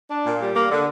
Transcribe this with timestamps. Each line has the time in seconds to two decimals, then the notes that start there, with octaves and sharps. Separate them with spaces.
0.10 D4
0.26 A#2
0.41 G3
0.56 A#3
0.71 D3